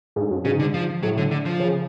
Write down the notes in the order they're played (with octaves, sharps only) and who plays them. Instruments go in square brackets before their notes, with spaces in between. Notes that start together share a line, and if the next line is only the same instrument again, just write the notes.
[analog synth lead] G#2
F#2
[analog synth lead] G#2 [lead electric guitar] C#3
[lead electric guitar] D3
F3
[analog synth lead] A2 [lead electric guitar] F#3
[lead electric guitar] D3
D3
F3
[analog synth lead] C#3